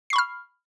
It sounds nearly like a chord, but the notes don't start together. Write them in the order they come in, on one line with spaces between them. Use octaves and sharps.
C7 C#6 B5 F6